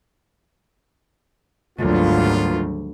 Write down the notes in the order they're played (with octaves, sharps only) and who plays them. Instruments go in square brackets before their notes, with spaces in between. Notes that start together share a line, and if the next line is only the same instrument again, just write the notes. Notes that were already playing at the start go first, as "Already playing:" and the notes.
[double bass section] G#1 F#3 G3 [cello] D2 [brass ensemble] A#3 B3 F4